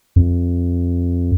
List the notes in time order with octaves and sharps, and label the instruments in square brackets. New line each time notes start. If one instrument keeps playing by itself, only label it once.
[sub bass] F2